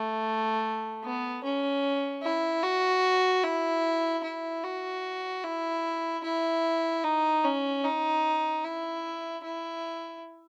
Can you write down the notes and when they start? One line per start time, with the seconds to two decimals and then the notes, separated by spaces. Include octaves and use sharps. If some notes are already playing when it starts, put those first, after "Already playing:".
Already playing: A3
1.04 B3
1.44 C#4
2.23 E4
2.63 F#4
3.43 E4
4.23 E4
4.64 F#4
5.44 E4
6.24 E4
7.04 D#4
7.44 C#4
7.84 D#4
8.65 E4
9.44 E4